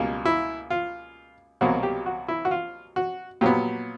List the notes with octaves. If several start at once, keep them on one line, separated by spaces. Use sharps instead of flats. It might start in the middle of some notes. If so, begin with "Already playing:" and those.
Already playing: C#2 B2 G3 A#3
E4
F4
C2 B2 F#3 A#3 F#4
G4
F#4
E4
F#4
F4
F#4
A#2 F#3 B3 G4